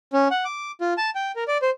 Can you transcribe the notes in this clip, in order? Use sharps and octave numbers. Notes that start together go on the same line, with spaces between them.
C#4
F#5
D6
F4
A5
G5
A#4
D5
C5